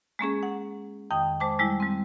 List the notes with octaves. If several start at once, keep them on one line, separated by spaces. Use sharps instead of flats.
G#3 A#3 C#4 G#4
F#5
F2 D#3 G5 D#6
G#3 C5 A5 D6
G3 G#3 E4
G3 C4